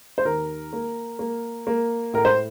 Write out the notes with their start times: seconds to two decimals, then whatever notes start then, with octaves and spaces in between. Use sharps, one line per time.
0.18 C5
0.25 D#2 A#4
0.73 A#3
1.19 A#3
1.67 A#3
2.13 A2 A#4
2.25 C5